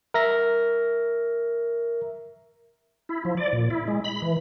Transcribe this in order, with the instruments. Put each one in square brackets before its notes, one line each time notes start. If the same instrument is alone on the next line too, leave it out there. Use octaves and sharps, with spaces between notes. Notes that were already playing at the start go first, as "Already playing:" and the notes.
[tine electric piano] A#4 E5 A#6
[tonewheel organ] E4
F3
D5
A#2
E4
G#3
B5
E3